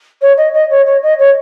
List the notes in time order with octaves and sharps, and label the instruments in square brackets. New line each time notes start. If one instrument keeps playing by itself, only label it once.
[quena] C#5
D#5
D#5
C#5
C#5
D#5
C#5